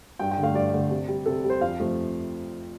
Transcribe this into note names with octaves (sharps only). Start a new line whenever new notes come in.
G2 G5
G5
D3
A3 F5
G2 D5
D3 A3
C3
G3
C3 A4
G3
C5
F2 F5
C3 F3 A3